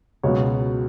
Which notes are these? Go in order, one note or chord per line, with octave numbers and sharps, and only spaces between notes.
C#2 B2 F#3 C#5